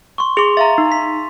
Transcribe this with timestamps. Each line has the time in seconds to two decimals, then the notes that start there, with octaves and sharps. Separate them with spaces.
0.18 C6 C#6
0.37 G#4 C6 D6 F7
0.57 E5 F5 A#5 A6
0.78 D#4
0.92 B6